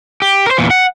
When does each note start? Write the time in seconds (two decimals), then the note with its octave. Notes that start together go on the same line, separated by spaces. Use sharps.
0.22 G4
0.47 A#4 C5
0.58 E2 A#2
0.70 F#5